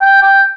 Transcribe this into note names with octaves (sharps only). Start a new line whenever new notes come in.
G5
G5